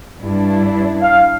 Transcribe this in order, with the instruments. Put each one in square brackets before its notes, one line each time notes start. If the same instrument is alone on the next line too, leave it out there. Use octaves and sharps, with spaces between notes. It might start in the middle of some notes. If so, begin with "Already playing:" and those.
[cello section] G2 D4 E4
[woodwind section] F5